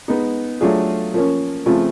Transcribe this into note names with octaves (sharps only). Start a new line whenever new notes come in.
G#3 B3 D#4
F#3 A3 D4 F4 G#4
F3 A#3 C#4
C#3 F3 A3 C4 F4